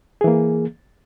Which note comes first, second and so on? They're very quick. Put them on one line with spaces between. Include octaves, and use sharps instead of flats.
G#4 E3 A#3